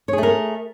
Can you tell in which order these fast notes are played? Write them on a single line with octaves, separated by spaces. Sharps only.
C#5 G#4 A3 A#4